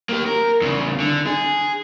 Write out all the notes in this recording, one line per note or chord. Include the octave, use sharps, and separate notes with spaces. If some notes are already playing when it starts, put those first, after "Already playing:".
A#3 G4
A#4
E2 C#3
D3
G#4